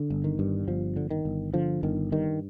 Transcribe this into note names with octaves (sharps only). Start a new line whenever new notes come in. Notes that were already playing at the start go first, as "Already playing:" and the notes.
Already playing: D3
G1
D#3
G2
G1 F3
D3
D#3
G1
D3 F3
G1 D#3
G2 D#3